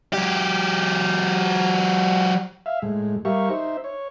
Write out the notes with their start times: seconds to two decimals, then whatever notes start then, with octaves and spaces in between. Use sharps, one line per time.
0.13 F#3 G4
2.66 E5 F5
2.82 A2 G#3
3.25 G3 G4 A#4 E5 F5 C#6
3.50 D#4 C5 E5
3.84 C#5